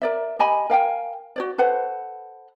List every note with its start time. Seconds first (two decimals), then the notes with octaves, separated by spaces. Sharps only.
0.02 A#4 D5 E5
0.39 G4 D#5 G#5 B5
0.70 A#4 F5 G5 G#5
1.36 F#4 C#5 D5
1.58 A4 B4 C5 F#5